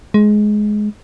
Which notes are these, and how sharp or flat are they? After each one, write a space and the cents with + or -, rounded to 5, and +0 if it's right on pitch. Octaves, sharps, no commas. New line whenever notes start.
G#3 +15